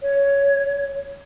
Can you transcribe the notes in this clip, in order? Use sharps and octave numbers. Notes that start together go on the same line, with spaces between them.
C#5